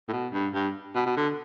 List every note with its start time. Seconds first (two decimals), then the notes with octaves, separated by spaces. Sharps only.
0.08 A2
0.13 B2
0.33 G2
0.54 G2
0.95 B2
1.06 B2
1.17 D3